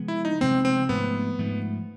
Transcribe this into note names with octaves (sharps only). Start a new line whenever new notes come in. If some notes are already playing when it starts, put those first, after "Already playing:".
Already playing: C3 F3 G#3 B3
E4
D#4
C3 F3 G#3 B3 C4
C4
G#2 F3 A3 B3
G#2 F3 A3